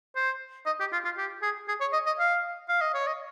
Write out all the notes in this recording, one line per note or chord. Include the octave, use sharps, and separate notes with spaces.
C5
D#5
G4
F4
F4
G4
G#4
G#4
C#5
D#5
D#5
F5
F5
D#5
C#5
D#5